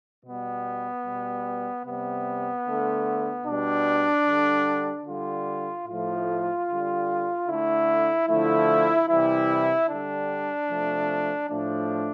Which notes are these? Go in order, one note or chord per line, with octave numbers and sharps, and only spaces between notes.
B2 G3 B3
B2 G3
C3 G3 B3
D3 A3
B2 G3 D4
D3 G3
D3 G3 F4
A2 F3 A3 F4
D3 G3
D3 A3 E4
D3 F3 A3 E4
C3 E3 G3 E4
D3 G3 D4
C3 F3 A3
A2 F3 A3 D4